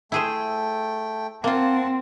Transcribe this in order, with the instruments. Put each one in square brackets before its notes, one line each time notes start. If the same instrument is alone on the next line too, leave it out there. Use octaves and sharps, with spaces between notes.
[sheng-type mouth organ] A3 G5 [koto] E4 G#4 C5
[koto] A#3 F4 [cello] C4 [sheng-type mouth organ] F#5 A5